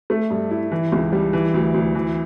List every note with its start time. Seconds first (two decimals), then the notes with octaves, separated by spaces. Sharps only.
0.10 A3
0.30 G2
0.51 E4
0.71 E3
0.92 C#2
1.12 G3
1.33 E3
1.54 D2
1.74 D2
1.95 E3